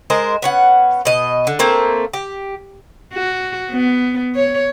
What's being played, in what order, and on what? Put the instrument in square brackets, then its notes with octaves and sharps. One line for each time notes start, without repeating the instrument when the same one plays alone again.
[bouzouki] G#3 A#4 C5 D#5
B3 C#4 F#5
B2 D#5
D3
A3 A#3 C4
G4
[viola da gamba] F#4
B3
C#5